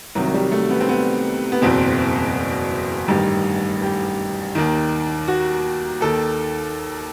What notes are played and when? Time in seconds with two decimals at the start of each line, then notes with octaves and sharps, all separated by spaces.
0.15 C2 C3 D#3 F#3
0.27 F#3
0.34 G3
0.52 A3
0.70 B3
0.81 C4
0.89 B3
1.52 B3
1.62 F#1 E2 B2 C4
3.08 A1 G2 D#3 G4
3.82 G4
4.55 D#2 D#3
5.28 F#4
6.01 D#2 D#3 A4